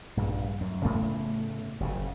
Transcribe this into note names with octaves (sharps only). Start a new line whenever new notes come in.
A#1 G2
F#2
A2 C#3 A3 B3
F#1 C#3